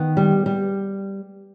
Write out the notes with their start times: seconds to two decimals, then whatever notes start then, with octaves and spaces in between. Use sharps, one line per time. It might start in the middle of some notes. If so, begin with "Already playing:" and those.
Already playing: D#3 B3
0.17 G3
0.46 G3